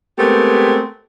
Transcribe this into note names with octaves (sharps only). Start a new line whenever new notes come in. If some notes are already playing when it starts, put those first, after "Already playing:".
G#3 A3 B3 C4 G4 A#4